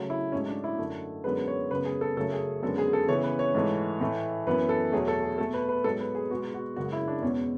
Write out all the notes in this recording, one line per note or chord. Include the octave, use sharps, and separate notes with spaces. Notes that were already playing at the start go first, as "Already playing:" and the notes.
Already playing: C#3 F#3 A3
E4
G#2 F#3 A3 C#4
D4
E4
F#2 D3 A3
F#2 D3 G#3 B3 B4
C#5
F#2 C#3 G#3 B3 B4
G#4
A4
F#2 C#3 F#3 A3 A4
G#4
F#2 D3 G#3 B3 A4
G#4
A4
C#3 E3 B3 C#5
B4
C#5
G#2 E3 A3
A2 E3 A3
F#2 E3 B3 B4
A4
E2 B2 F#3 A3 G#4
A4
G#4
B2 A3 A4
B4
B4
G#2 F#3 B3 A4
B4
G#4
B2 G#3 B3 F#4
F#4
F#2 C#3 G#3 F#4
E4
D4
E2 B2 G#3 B3 C#4